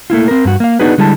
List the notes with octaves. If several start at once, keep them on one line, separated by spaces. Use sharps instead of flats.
A3 A#3 E4 F4
C4 A#4
G2 F#4
A#3 F5
B3 D4 D#4 F#4 G#4 B4
D3 G3 G#3 E4 A5